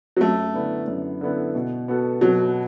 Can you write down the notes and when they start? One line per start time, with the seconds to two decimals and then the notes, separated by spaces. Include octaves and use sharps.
0.17 F#3
0.21 F#2 A3
0.54 D3 B3 E4
0.87 F#2
1.21 D3 B3 E4
1.55 B2
1.88 B3 F#4 A4
2.21 B2 F#3